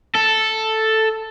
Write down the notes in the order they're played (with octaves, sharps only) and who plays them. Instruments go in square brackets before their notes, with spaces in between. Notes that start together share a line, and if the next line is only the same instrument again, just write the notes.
[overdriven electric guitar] A4